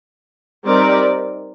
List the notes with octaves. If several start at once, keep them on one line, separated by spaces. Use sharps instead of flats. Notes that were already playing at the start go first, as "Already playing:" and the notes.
G3 C4 D#4 A#4 D5